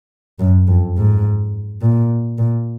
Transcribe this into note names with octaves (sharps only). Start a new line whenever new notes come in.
F#2
F2
G#2
A#2
A#2